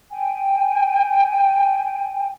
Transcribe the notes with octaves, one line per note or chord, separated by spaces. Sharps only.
G5 G#5